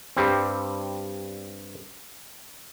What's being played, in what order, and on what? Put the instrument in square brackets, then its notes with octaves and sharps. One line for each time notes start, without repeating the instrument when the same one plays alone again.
[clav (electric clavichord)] G2 G3 C4